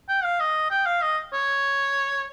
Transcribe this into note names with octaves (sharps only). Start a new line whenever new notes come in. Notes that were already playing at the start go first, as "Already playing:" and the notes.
G5
F5
D#5
G5
F5
D#5
C#5